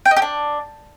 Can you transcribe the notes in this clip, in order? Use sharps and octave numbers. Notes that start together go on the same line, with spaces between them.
G5
D#5
G4
D4